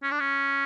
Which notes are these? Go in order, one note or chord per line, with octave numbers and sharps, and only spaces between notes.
C#4
D4
C#4